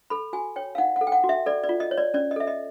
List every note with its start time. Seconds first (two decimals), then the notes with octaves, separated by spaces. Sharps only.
0.10 A4 B5
0.33 F#4 G#5
0.56 C#5 G5
0.75 F5
0.78 D#4 F#5
0.96 F#5
1.01 A4
1.07 G5
1.12 F#5
1.24 F#4
1.29 E5
1.46 A4 D5
1.64 D5
1.69 F4
1.80 D#5
1.91 C#5
1.97 D5
2.14 C#4 D5
2.31 D#5
2.36 A4 E5
2.47 D#5